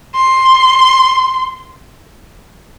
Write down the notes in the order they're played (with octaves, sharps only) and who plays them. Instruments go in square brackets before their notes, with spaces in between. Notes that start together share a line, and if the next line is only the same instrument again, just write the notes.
[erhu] C6